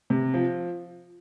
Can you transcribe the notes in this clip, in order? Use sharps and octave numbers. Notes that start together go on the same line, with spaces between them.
C3
F3